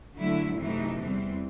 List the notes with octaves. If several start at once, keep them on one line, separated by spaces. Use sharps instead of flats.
D3 F#3 A3 E4
F#2 C3 E3 F#3 A3 D#4
E2 E3 G3 C4